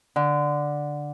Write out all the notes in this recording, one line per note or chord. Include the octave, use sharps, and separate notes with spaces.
D3